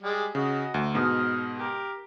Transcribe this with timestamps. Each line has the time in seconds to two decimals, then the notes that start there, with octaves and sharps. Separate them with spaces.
0.02 G3 G#3
0.35 C#3 F#4 D#5
0.74 D2
0.94 G#2 B2 D#6 F6
1.58 G4 A#4